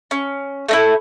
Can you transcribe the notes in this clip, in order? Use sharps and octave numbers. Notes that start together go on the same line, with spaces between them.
C#4
A3 D#4 E4